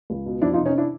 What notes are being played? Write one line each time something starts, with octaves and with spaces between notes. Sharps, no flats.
C#2
B2
F2 D4 E4
D#4 F4
C3
C#4 D#4
D4 E4